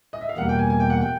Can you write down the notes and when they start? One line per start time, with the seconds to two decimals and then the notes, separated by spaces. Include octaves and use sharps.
0.13 D#5
0.21 E5
0.29 F5
0.37 E2 B2 G3 A#3 F#5
0.49 G5
0.59 G#5
0.70 G#5
0.80 G5
0.90 F#5
1.01 G5